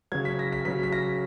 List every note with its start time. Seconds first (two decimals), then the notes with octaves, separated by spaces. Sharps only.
0.12 C#3 F#3 G#6
0.25 B6
0.39 A#6
0.53 B6
0.65 C#3 F#3 B6
0.83 B6
0.93 A#6